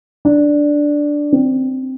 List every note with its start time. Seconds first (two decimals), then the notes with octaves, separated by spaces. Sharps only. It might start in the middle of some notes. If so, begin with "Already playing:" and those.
0.25 D4
1.32 C4